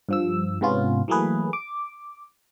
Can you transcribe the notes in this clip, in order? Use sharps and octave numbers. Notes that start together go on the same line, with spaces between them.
G2 F3 E6
G#2 C3 B3 C#4 F4
E3 F#3 A3 A#3 G#4 B4
D6